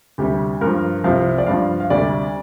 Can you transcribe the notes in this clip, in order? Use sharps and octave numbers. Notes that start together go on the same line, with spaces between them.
D2 C3 G3 G4
G2 F3 A#4
C2 C3 F3 F5
D5
G2 F3 F5
F5
D2 C3 G3 D5